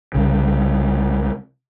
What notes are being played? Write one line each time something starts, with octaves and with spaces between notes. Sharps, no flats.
C2 C#3